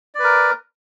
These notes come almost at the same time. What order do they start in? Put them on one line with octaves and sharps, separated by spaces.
D5 B4 A#4